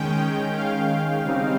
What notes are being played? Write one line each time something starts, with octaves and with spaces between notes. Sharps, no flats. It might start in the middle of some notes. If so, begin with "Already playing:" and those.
Already playing: D#3 G#3 C#4 G5
F5
C#3 G3 C4 D#4